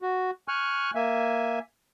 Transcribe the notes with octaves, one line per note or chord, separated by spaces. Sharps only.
F#4
G#5 C#6 F6 F#6
A#3 E5 G#5